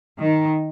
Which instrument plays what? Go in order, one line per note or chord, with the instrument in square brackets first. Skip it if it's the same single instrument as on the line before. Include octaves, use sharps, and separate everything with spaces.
[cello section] D#3